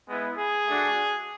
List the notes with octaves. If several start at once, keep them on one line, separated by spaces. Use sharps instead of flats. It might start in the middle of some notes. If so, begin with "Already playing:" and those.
G#3 B3 E4
G#4
A3 D4 F#4